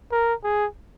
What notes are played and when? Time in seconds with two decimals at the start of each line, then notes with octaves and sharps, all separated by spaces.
0.12 A#4
0.44 G#4